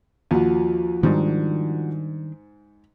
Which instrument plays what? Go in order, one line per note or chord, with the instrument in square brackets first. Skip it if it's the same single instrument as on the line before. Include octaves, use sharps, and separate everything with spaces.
[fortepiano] D#2 [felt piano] F3 F#4
[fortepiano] G#2 [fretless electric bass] D#3 G3 D4